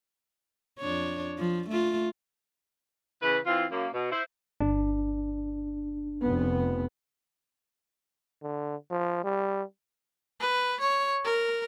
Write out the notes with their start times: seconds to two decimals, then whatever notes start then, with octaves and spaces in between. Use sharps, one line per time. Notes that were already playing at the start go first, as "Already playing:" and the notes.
0.79 F2 D4 C#5
1.38 F3
1.69 A3 F4
3.22 C#3 E3 B4
3.46 E3 C4 F4
3.70 F#2 A#3
3.93 B2
4.11 E4 C5
4.60 G1 D4
6.22 F1 B3
8.43 D3
8.91 F3
9.24 G3
10.40 B4
10.80 C#5
11.24 A#4